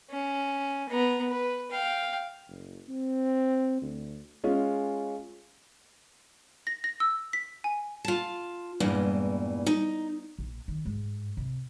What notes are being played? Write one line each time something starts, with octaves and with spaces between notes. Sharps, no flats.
C#4
B3 A#5
B4
F5 G5
F#1
C4
D2
G#3 C#4 F4
A#6
A#6
E6
B6
G#5
F4 A5
E2 G2 A#2 E3 G#3
D#4
A#1
D#3
G#2
C3